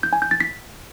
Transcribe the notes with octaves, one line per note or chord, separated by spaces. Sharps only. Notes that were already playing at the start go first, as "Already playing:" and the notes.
G6
G#5
G6
A6
B6